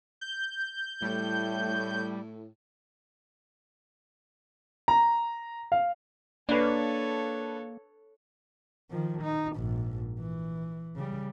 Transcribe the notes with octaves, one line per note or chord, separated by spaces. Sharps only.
G6
A2 G3
A#5
F5
A#3 D4 A4 B4 C#5
D#3 F3
D#4
A#1 G#2
E3
C#3 G3